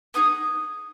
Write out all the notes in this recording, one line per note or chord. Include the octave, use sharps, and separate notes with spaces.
B3 D#4 G#4 D#6